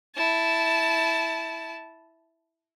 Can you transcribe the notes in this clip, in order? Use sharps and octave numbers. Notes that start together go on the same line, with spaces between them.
E4 A5